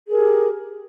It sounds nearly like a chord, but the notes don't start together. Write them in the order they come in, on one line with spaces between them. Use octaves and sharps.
G#4 A#4 G4